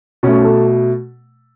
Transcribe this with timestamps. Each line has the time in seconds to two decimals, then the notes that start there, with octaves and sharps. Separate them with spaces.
0.23 B2 A3 C#4
0.44 A4